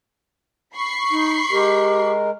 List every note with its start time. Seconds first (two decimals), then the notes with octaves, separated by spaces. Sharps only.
0.75 B5 C#6 C7
1.11 D#4
1.51 G#3 G4 A#4